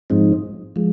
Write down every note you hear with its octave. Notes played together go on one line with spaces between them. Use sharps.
G#2 F3 G#3 C4 D#4
F3 G#3